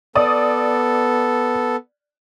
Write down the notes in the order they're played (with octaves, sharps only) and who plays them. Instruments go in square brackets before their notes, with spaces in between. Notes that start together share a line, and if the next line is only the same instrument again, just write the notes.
[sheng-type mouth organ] B3 A4 [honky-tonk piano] D5 D#6